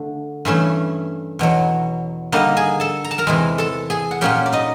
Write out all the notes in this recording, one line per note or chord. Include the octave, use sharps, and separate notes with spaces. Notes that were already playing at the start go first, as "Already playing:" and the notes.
Already playing: D3 A3 D4
G2 E3 A3 C#4
E2 B2 F#3
D3 G3 A#3 D#4 D#5
G#4 G#5
A4 A5
A#5
A5
A#4 A#5
E2 C3 E3 G#3
A4 A5
G#4 G#5
F#5
A#2 F#3 A#3 C#4 G4 G5
D5
D#4 D#5